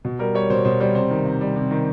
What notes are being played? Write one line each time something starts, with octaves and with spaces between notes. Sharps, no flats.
B2
G3 A#4
G3 C#5
B2 C5
B2 C5
G3 C5
C3 C5
D#3
C3
G3
C3
D#3